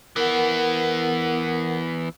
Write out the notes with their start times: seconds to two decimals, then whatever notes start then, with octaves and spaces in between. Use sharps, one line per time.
0.16 E3 B3 A#4 F#5